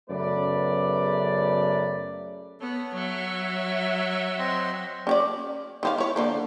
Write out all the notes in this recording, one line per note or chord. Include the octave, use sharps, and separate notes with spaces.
F#2 C#3 A3 B3 B4 D5
B3 A4 C#5
F#3 C#5 E5
C4 D#5 C6
C#4 C#5 D5
D#3 C4 F5
E4 C#5
D3 F3 A#3